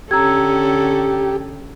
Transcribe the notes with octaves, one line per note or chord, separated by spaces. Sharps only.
D3 C#4 G4 A4 A#5 E6 G#6